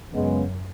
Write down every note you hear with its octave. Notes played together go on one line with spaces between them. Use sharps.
F#2 C#3 G#3 B3